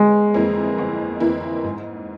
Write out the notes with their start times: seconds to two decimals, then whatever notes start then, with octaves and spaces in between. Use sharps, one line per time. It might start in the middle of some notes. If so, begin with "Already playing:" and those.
Already playing: G1 G#3
0.34 F2 E3 A#3 E4
0.78 G1
1.20 F2 E3 A#3 E4
1.64 G#2